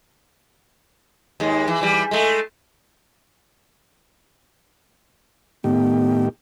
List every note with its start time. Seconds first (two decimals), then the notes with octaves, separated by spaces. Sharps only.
1.40 D#2 G#3
1.68 E3
1.81 E3 G3
2.11 G#3 A3
5.64 A2 D#3 B3 G4